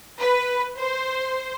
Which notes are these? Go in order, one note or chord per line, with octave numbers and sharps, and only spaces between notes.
B4
C5